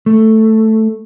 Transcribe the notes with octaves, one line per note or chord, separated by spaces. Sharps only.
A3